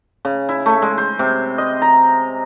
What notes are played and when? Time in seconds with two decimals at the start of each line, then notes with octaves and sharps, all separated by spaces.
0.25 C#3
0.49 E4
0.66 A3
0.82 G#3
0.98 C5
1.19 C3
1.58 D#5
1.82 A#5